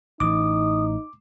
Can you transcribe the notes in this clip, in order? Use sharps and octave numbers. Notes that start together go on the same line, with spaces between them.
A1 A2 E3 D#4 D6 D#6